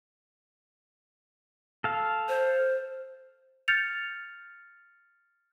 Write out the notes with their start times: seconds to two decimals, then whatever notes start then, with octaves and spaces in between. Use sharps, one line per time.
1.84 A4 F5
2.29 C5
3.68 F6 G6 A6 C#7 F7